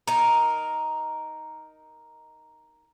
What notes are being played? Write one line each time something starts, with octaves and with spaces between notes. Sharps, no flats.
D#4 A#4